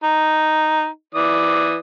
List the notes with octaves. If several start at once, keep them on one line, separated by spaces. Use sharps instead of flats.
D#4
E3 D5 D#6